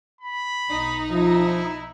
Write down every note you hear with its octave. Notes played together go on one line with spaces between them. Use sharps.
B5
B1 D#4
F3 E4